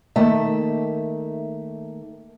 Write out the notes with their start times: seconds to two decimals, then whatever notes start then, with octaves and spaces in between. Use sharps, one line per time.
0.16 D#3 A3 A#3 E5